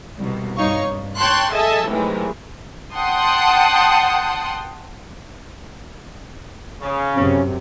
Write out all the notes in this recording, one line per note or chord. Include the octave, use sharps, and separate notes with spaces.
C2 B2
G2 D#4 C#5 F5 C#6
G2
C#5 G5 A5 C6 C#6 F#6
G#4 A4 D#5 E5 G#5 A5
A2 C3 D#3 E3 F#3 G#3
F#5 G5 A5 C6 D#6
C#3
F#2 C3 C#4